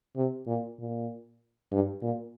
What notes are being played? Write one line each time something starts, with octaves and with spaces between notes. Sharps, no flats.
C3
A#2
A#2
G2
A#2